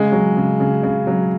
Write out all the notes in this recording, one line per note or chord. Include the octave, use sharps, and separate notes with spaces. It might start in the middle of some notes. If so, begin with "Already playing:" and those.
Already playing: C#3 G#3
F#3
C#3
C#3
C#3
F#3